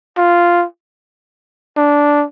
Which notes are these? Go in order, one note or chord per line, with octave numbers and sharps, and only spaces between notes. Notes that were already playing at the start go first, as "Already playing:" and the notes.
F4
D4